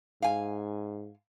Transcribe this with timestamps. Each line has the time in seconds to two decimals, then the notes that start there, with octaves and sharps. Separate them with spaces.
0.22 G#2 F5 G#5